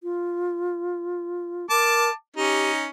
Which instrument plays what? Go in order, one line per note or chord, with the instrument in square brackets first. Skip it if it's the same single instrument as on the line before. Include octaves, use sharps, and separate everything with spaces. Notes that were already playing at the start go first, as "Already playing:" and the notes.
[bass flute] F4
[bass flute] A#4 [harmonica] A5 D6
[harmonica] C#4 D#4 [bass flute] G4